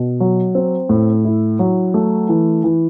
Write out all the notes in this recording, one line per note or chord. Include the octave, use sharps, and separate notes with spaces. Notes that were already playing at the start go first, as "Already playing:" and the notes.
Already playing: B2
F#3
C4
A2
E4
F#3
A3
E3
E3